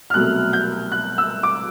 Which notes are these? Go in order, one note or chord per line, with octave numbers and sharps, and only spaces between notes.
F6
C2 B2 F#3 A3 F#6
G6
F#6
E6
D6